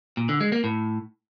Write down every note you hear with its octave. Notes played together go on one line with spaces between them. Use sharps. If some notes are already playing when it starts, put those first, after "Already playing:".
A#2
D3
G#3
A#3
A2